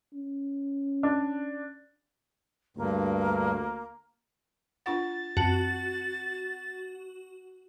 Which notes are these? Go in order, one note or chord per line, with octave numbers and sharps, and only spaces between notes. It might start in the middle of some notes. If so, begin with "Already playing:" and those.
C#4
D4
D2 G2 A#3
D4 F4 F#5 A6
F#2 C4 F#4 A5